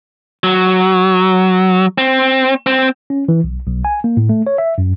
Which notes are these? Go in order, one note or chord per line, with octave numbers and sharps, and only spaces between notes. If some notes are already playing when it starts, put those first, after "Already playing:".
F#3
C4
C4
C#4
E3
B1
B1
G#5
A#3
A2
A3
C#5
E5
F#2